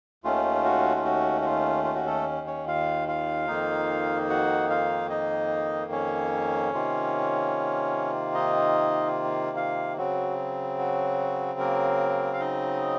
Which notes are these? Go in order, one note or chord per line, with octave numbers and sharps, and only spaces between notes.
D#2 D#3 A3 C#4 F4
F#4
F4
F#4
F#4
F4
F4
F#4
A3 A4
C#4 C#5
F4 F5
F4 F5
F2 D#3 A#3 D#4
F#4 F#5
F4 F5
D#4 D#5
C#4 C#5
C3 D#3 A#3 F4
D#4 D#5
F4 F5
C#3 F#3 C4 F#4
F#4
A#3 A#4
F5
D#4 D#5